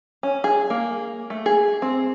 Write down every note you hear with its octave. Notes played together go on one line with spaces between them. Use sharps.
C#4
G#4
A#3
A3
G#4
C4